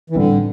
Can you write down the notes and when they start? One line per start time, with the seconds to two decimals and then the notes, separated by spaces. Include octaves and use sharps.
0.10 E3
0.16 A2 D3 G3 C4